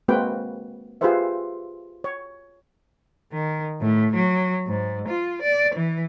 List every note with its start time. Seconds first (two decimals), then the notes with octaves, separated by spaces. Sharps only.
0.08 G#3 A#3 C4 F#4 B4 G5
1.01 F4 G4 G#4 B4 C5 E5
2.04 C#5
3.32 D#3
3.81 A2
4.15 F#3
4.67 G#2
5.08 F4
5.42 D5
5.75 E3